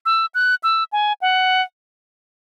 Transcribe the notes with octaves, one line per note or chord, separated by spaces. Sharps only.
E6
F#6
E6
G#5
F#5